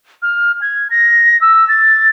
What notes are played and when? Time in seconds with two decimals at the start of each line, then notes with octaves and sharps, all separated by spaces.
0.22 F6
0.62 G#6
0.90 A#6
1.41 E6
1.68 A6